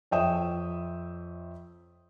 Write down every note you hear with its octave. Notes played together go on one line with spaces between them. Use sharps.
F2 C#5 E5 G5 D#6 E7